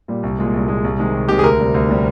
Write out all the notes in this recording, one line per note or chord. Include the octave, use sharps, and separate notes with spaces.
A#2 G3
C2
A#2 G#3
C2
A#2 G#3
C2
C3 D#3 G#3
C2
C3 D#3 G#3 G4
G#4
D2 A#4
C3 G3
D2
C3 G3